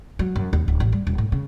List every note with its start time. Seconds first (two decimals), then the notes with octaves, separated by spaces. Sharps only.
0.19 F#3
0.36 F#2
0.53 D#2
0.68 D1
0.80 A1
0.92 G3
1.07 D#1
1.18 A2
1.32 C#3